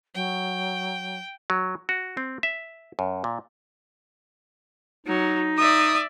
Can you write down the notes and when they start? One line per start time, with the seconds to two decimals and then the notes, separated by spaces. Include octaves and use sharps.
0.14 F#3 G5
1.50 F#3
1.89 F#4
2.17 C4
2.43 E5
2.99 F#2
3.24 A#2
5.07 F#3 D#4
5.58 D5 E5 D#6